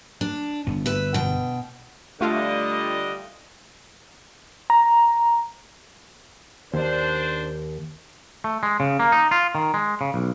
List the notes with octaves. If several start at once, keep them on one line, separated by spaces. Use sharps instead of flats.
D4
G1 G2 B3
B4 E5
B2 G5
D3 G3 A3 F4 D#5
A#5
D#2 D4 C5
A3
G#3
C#3
A#3
D#4
F4
D#3
G#3
C#3
B1